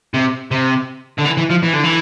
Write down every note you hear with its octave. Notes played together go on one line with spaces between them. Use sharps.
C3
C3
D3
E3
E3
F3
E3
D3
E3